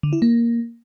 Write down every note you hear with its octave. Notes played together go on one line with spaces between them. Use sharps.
D3
E4
A#3